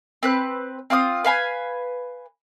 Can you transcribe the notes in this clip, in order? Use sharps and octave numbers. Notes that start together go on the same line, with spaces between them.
C4 B4 F#6
C4 F4 F5 D#6
B4 F5 G#5 B5